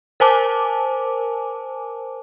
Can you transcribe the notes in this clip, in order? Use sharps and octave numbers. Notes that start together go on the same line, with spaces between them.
A#4 C5 G#5 A5 D6